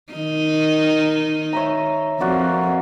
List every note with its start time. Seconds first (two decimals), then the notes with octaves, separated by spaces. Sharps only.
0.13 D#3 D#4
1.53 C#5 E5 A#5
2.20 F2 F#4 A#4 D5